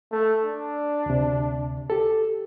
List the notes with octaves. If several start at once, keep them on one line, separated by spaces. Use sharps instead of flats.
A3
D4
D2 C3
G4 A4